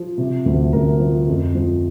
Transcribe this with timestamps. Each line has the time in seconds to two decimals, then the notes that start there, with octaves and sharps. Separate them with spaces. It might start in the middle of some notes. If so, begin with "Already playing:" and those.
Already playing: F3
0.18 C3
0.46 D2
0.73 D2 A#4
1.00 F3
1.28 F2
1.55 F3